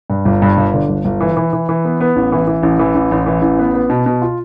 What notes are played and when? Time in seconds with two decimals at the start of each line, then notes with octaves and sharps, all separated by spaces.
0.10 G2
0.25 G1
0.42 G2
0.57 G1
0.74 D3
0.89 G1
1.05 G1
1.20 E3
1.37 E3
1.53 E3
1.69 E3
1.85 B3
2.01 B3
2.16 A1
2.32 E3
2.47 E3
2.63 A1
2.79 E3
2.95 A1
3.11 A1
3.26 E3
3.42 A1
3.59 B3
3.74 B3
3.90 B2
4.06 B2
4.22 F4